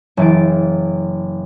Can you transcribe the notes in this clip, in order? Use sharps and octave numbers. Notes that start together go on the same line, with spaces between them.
F#1 E3 A6 D7